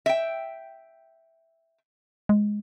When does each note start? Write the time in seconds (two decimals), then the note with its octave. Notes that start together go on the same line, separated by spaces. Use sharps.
0.06 E5 G5
2.29 G#3